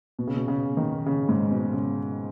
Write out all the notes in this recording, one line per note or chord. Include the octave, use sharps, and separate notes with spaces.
B2
C#3
B2
C#3
D#3
C#3
G#2
B2
C#3